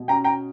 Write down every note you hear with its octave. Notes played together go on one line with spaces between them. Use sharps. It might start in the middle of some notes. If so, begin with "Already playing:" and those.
Already playing: B2
C#4 G5 A#5
G5 A#5